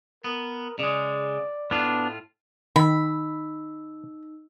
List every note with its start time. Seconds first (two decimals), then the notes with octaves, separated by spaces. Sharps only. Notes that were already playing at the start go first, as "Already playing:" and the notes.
0.24 B3 A#4
0.79 C#3 G#3 D5
1.71 A2 B3 D4 F4
2.76 D#3 D#4 B5 E6